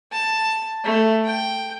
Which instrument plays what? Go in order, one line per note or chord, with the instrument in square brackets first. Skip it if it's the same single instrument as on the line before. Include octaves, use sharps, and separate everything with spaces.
[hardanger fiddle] A5
A3
G5